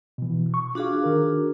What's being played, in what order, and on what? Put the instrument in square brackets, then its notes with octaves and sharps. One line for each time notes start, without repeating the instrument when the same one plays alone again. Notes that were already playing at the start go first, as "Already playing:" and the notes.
[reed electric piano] B2 E3
C#6
[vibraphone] D4 F#4 G#4 [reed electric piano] F4 F5
[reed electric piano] D#3 A#4